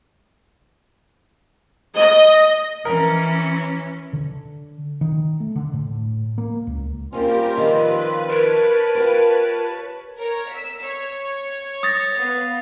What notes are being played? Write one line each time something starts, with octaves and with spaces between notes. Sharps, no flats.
D#5
E3 C#4 A#4
D3
D#3
A3
D3
A2
A#3
C#2
G3 A#3 C4 C#4 F4 G4 A#4
D#3 F3 D#4 B4
A#4 C#5 A5
F4 G4 C5
A#4 C#5
E6 B6
C#5
D#6 A6 A#6
B3 F5